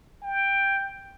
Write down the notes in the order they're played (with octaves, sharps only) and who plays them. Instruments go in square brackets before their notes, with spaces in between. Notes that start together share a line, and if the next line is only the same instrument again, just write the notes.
[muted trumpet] G5